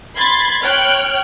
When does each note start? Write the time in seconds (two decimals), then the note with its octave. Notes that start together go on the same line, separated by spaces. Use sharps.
0.16 B5 C6 G#6 A6
0.62 C#5 G5 F6 F#6